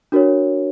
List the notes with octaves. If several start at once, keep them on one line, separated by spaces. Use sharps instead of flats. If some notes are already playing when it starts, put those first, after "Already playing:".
D4 F#4 A#4 C#5